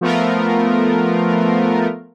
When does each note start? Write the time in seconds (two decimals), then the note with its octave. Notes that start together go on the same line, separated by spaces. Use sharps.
0.01 F3 A3 B3 F4 A#4